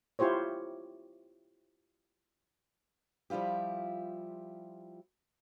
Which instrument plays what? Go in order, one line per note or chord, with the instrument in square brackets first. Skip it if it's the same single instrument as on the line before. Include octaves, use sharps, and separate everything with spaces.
[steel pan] E4 F4 G4 C5 C#5
[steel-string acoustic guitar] F3 G3 E4 F4 G4